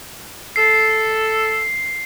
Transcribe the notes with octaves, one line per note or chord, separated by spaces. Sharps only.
A4 C7